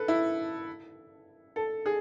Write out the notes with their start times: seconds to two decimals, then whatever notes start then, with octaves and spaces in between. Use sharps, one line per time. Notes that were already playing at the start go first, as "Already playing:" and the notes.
Already playing: A4 B4
0.08 E4
1.56 A4
1.86 G#4